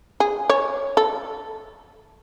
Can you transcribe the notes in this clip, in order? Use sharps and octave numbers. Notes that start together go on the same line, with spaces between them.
G#4
C#5
A4